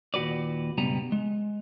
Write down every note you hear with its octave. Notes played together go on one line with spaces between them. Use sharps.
D#2 A#2 F#4 B4 D5
C#2 G2 B2 G3 B3 A#5
G#3